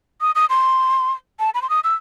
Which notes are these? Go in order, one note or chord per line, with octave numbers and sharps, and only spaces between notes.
D#6
D#6
C6
A5
B5
C6
D#6
E6